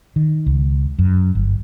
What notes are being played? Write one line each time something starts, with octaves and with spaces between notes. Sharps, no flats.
D#3
C#2
F#2
G1